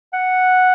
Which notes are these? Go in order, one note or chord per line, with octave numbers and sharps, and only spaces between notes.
F#5